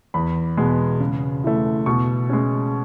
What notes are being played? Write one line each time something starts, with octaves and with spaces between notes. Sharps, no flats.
E2 B5
B2 G#3 B3
C#3
E3 A3
B2 C#6
G#3 C#4